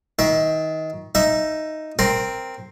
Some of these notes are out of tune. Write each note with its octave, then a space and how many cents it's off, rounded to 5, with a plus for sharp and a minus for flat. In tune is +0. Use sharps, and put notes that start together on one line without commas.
D#3 +25 E5 +0
D#4 +0 E5 +10
C4 +0 A#4 +0